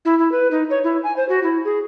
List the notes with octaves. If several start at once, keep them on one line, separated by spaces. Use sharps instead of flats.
E4
E4
B4
D#4
C#5
E4
G#5
C5
F#4
E4
G#4